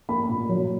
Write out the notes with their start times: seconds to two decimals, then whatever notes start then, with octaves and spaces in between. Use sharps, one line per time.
0.09 A#3 B5
0.29 A#2
0.49 F#3